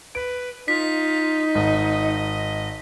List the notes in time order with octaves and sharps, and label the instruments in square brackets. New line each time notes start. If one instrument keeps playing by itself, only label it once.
[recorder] B4 [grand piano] D7
[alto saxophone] D#4 [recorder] F4 [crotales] B6
[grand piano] G#1 [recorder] D#5